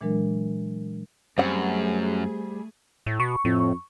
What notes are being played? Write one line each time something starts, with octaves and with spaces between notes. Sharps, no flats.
A#2 E3 F#3 G#3 D4 A#4
F#2 G3 A3 C4 G#4 F#5
A2
B2 C#6
F2 A2